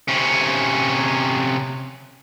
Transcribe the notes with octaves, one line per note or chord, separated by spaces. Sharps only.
C3 C#4